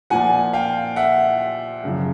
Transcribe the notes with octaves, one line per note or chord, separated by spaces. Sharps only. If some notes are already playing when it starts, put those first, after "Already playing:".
A#2 F3 F#5 G#5
F5 G5
E5 F#5
F#2 C#3 F3